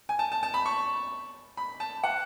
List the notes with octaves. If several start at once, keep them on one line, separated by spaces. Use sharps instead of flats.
G#5
A5
A5
A5
B5
C#6
B5
A5
F#5